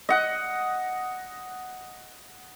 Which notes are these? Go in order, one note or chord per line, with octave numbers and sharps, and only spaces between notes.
D#5 F#5